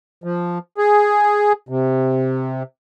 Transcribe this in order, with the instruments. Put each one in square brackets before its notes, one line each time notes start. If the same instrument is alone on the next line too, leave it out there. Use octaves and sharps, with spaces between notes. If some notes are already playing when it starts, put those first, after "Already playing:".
[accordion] F3
G#4
C3